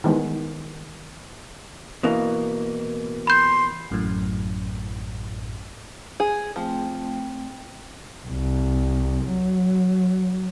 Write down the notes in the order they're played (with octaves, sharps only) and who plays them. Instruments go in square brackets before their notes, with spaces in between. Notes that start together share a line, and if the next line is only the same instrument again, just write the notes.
[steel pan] D#3 E3 G3 G#3 B3
[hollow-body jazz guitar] B2 E3 A#3
[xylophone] B5 G6 [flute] C6
[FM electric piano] A1 F#2 A2
[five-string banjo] G#4
[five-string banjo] F3 [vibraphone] A3 C4 G5
[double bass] C2
F#3